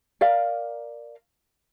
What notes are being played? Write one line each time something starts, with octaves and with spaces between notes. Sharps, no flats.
A#4 D5 F5